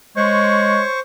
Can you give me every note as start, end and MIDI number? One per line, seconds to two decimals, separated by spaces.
0.16 0.83 56
0.16 1.00 72
0.16 0.92 73
0.16 1.00 85